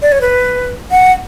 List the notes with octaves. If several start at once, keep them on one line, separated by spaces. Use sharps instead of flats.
D5
C#5
B4
F#5